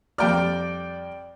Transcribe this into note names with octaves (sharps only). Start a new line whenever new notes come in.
F2 G3 D5 G5 F6